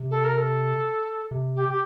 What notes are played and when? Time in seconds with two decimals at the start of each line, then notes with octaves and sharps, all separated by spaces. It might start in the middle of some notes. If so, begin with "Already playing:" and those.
Already playing: C3
0.11 A4
0.25 A#4
0.38 A4
1.31 C3
1.56 G4
1.69 G4